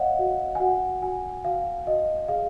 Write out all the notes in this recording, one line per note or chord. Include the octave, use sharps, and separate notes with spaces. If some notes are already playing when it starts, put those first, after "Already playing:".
Already playing: C#5 D#5 F5 F#5
F#4
G#5
F#4 F#5
F#4 G#5
F#4 F5
F#4 D#5
G#4 F5